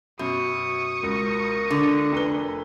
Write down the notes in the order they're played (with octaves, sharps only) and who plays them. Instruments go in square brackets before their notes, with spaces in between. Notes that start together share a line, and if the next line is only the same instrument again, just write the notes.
[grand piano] F#2 [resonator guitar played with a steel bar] B2 [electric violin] C#6 D#6
[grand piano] C#2 [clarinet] A#4
[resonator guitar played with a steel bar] D3
[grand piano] F1 B4 G7